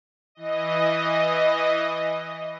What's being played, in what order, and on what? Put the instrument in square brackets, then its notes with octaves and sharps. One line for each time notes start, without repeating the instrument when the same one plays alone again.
[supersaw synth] E3 D#5